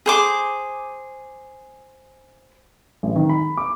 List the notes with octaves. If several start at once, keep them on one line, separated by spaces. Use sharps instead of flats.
G#4 C5 D6
A1
D#3
B5
D6